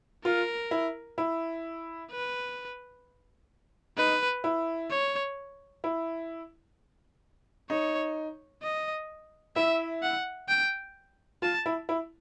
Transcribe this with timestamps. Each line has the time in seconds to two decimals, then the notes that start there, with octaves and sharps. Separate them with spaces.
0.25 F4 A#4
0.71 E4
1.18 E4
2.11 B4
3.98 D#4 B4
4.44 E4
4.90 C#5
5.84 E4
7.70 D#4 C#5
8.63 D#5
9.56 E4 E5
10.03 F#5
10.49 G5
11.42 F4 A5
11.66 E4
11.89 E4